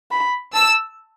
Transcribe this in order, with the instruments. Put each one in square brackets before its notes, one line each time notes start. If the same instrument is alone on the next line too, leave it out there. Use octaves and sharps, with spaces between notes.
[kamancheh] B5
[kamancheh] A5 [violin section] E6